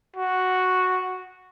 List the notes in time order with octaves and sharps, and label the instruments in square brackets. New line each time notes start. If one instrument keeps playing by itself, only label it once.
[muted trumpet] F#4